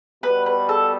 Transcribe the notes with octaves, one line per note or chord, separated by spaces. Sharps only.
B2 G3 B3 B4
B4
A4